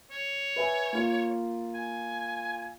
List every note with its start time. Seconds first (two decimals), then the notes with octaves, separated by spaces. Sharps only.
0.11 C#5
0.56 B4 E5 G#5
0.93 A#3 F4
1.75 G#5